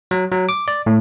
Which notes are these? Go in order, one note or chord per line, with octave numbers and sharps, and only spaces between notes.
F#3
F#3
D6
D5
A2